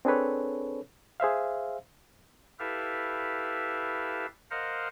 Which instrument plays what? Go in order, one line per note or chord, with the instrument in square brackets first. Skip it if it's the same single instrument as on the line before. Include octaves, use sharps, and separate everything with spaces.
[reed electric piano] C4 D4 G#4 A4 B4 C#5
G#4 C5 E5 F5
[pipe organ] E4 G4 A4 B4 E5 F5
A#4 C5 D#5 F5 F#5